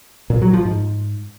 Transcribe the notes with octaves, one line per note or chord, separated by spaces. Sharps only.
A#2
F#3
F3
G#2